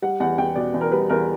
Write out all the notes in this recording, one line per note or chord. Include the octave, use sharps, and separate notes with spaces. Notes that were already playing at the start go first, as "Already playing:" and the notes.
G3 F#5
E2 F#5
E2 G5
B2 D5
E2
A#4
G3 B4
E2 A#4